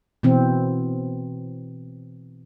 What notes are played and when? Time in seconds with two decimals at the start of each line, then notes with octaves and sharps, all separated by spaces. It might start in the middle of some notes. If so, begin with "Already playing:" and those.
0.23 B2 E3 C4